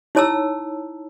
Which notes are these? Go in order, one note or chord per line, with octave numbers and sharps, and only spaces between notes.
D#4 E4 C#5 A5 A#5 E6